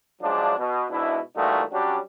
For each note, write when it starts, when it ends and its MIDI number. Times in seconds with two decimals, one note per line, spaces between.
0.22 0.54 49
0.22 0.54 53
0.22 0.54 54
0.22 0.54 56
0.22 0.54 62
0.58 0.86 47
0.91 1.19 44
0.91 1.19 47
0.91 1.19 62
0.91 1.19 64
1.37 1.62 46
1.37 1.62 52
1.37 1.62 55
1.37 1.62 57
1.37 1.62 63
1.37 1.62 66
1.73 1.98 54
1.73 1.98 55
1.73 1.98 61
1.73 1.98 62
1.73 1.98 66
1.73 1.98 67